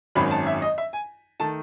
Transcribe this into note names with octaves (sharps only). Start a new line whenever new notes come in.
G#1 F#2 D#3 F#3 B5
A5
E5
D#5
E5
G#5
D#3 A3 A5